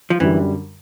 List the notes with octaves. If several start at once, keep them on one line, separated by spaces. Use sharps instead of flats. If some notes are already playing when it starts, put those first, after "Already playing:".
F3
F#2 D3 E3 G3